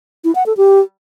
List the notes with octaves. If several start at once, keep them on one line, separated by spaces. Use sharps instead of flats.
E4
F#5
A4
G4